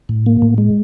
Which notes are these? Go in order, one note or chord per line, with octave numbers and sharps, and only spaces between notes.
A2
A#3
A2
G#3